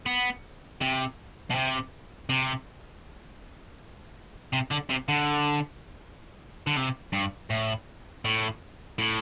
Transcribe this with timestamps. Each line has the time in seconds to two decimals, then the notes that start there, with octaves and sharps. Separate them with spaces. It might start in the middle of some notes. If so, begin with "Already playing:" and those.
0.06 B3
0.81 C3
1.50 B2
1.55 C3
2.30 C3
4.53 C3
4.71 D3
4.90 C3
5.09 D3
6.67 D3
6.77 C3
7.13 G2
7.50 A2
8.25 A2
8.99 A2